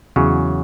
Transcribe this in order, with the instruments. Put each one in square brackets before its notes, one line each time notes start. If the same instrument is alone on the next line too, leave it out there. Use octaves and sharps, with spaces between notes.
[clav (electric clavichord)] E2 C#3 F#3